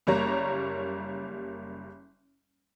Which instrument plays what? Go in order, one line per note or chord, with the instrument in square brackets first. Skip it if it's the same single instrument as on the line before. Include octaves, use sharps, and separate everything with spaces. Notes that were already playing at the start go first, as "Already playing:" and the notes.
[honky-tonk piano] F#1 G3 A#3 C#5 A#5